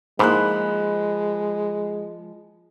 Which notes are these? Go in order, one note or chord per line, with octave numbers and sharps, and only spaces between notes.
G#2 F3 G#3 A#3 E4 B5 F#6